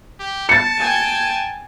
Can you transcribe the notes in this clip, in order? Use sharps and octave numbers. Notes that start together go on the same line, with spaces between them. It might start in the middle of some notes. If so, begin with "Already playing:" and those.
G4
A5 A6 C#7
G5 G#5